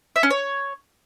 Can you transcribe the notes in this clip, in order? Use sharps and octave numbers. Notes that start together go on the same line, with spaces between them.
E5
C#4
C#5